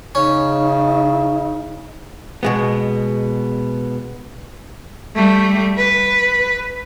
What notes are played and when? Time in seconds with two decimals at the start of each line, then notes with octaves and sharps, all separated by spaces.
0.15 C#3 C#4 D#4
2.43 B2 G#3 B3
5.16 G3 A3
5.78 B4